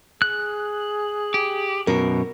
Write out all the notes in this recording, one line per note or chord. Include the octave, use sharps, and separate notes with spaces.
G#4 F#6
G4
F#2 B2 A#4